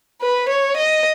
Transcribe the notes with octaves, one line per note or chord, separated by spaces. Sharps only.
B4
C#5
D#5